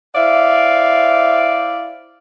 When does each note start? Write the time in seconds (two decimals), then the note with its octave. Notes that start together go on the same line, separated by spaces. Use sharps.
0.16 E4 C5 D5 E5 F5